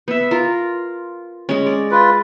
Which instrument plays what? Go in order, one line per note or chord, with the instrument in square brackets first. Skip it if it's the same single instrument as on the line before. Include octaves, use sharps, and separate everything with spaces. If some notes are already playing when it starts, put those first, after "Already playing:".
[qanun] B3 E5
F4 A#4
G#3 C#4
D5
[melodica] F4 B4